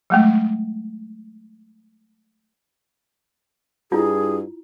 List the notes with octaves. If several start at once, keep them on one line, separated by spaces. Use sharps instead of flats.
F#3 G#3 A3
G2 E4 F4 G#4